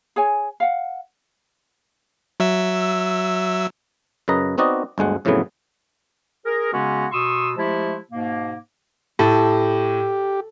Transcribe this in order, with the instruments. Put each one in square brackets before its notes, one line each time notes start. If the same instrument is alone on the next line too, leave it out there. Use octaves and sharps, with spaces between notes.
[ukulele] G#4 C#5 G#5
F5 F#5
[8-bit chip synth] F#3 E5 E6
[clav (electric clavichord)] F#2 C#3 B4 D#5 A#5
B3 C4 D#4 F#4 D5 D#5
G1 D2 G#3 F#5
F2 A2 C#3 E3 F#3 B3
[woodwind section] G#4 A#4
C#3 G#3 B3 C#4 F#4
B2 C6 C#6 D#6 E6
F3 G#3 A3 E4 G4
G#2 B2 A#3
[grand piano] A2 [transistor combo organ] G4 [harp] A4